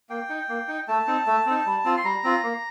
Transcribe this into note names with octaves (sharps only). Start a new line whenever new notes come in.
A#3 G5
D#4
A#3
D#4
A3 A5
C4 D#4
A3
C4 D#4
G3
C4 F4
C6
G3 A#5
C4 F4
A#3